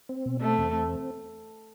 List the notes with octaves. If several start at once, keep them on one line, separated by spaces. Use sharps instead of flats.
C4
B2
A3 C4
E2
C4